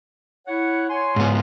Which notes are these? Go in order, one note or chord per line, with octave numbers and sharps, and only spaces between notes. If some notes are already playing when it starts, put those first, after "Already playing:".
E4 C#5 F#5
C#5 G#5 C6
G#2 B3